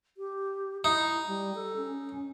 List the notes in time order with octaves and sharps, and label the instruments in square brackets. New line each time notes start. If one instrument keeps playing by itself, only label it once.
[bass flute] G4
[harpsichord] D#4 [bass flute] E4
[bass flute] G3
A4
C#4